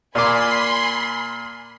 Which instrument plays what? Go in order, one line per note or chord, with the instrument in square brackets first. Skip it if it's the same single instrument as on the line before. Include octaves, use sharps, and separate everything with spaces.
[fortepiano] A#2 D6 [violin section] G#5 B5 C6